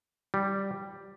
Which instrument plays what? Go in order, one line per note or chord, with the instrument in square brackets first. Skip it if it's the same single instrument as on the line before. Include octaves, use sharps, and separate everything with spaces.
[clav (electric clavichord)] G3